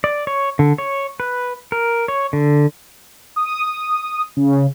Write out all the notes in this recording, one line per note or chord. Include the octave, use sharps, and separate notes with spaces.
D5
C#5
D3
C#5
B4
A#4
C#5
D3
D#6
C#3